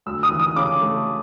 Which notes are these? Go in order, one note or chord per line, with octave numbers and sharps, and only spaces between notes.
D2 E6
D#6
E3
D#6
C#3 D6
A3